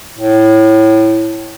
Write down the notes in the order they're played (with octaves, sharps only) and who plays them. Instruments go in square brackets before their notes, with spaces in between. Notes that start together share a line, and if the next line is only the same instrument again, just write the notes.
[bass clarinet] A2